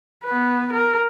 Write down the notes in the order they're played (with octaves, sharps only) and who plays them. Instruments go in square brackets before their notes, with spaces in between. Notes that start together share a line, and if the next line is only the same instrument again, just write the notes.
[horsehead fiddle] B3 B4
A#4